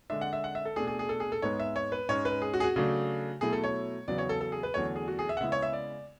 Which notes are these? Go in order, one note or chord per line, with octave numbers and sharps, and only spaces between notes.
D3 G#3 D4 E5
F#5
E5
F#5
E5
A4
B2 A3 D4 G#4
G#4
G#4
A4
G#4
A4
G#2 G#3 B3 C#5
E5
C#5
B4
G#2 G#3 C#4 C#5
B4
G#4
F#4
G#4
F#4
C#3 F#3 A3 D4
B2 F#3 A3 E4 G#4
A4
C#5
E2 C#3 F#3 B3 D5
C#5
A4
A4
G#4
B4
E2 D3 F#3 A3 C#5
G#4
F#4
G#4
E5
F#5
C#3 G#3 B3 E4 E5
C#5
E5
D5